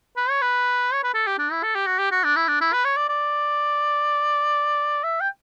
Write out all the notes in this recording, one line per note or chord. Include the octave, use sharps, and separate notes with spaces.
B4
C#5
B4
C#5
B4
A4
G4
D4
E4
A4
G4
F#4
G4
F#4
D4
E4
D4
E4
B4
C#5
D5
D5
E5
G5